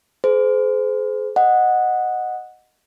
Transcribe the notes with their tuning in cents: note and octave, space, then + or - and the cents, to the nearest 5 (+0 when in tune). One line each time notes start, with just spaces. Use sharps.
G#4 +35 C5 -30
D#5 -5 F#5 -10